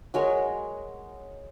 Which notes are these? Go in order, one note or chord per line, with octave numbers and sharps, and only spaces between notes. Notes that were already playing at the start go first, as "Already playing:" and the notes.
F#3 G#3 A#4 C#5